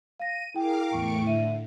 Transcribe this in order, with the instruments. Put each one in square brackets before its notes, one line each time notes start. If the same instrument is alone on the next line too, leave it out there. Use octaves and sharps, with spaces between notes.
[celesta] F5 A#6 [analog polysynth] D#7
[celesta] E4 G5 [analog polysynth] G#4 [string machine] A#4 F5 D6
[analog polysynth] E2 C#6 D7 [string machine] A2 [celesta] G5
[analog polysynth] D3 [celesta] E5 D#7